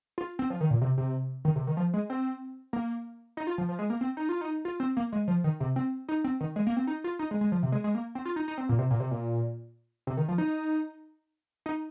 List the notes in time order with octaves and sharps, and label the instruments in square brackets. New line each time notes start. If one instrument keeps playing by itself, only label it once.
[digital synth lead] F4
C4
F3
D#3
A#2
C3
C3
D#3
C3
D#3
F3
G#3
C4
A#3
D#4
F4
F3
F3
G#3
A#3
C4
D#4
F4
D#4
F4
C4
A#3
G#3
F3
D#3
C3
C4
D#4
C4
D#3
G#3
A#3
C4
D#4
F4
D#4
G#3
G#3
F3
C3
G#3
G#3
A#3
C4
F4
D#4
D#4
C4
A#2
C3
A#2
C3
A#2
C3
D#3
F3
D#4
D#4